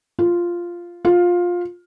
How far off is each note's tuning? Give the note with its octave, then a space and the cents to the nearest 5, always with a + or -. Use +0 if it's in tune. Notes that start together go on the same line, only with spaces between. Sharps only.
F4 -5
F4 +15